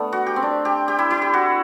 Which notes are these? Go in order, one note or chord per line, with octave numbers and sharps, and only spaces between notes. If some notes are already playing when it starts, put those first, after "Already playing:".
Already playing: A3 B3 D4
F#4
G4
C4
D4
G4
G4
E4
E4
G4
F#4